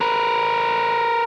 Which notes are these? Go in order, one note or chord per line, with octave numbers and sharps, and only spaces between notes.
A#4 B4